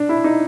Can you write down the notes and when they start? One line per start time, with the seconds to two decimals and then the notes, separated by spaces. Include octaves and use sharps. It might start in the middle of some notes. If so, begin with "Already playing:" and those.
Already playing: D4
0.09 E4
0.24 D#4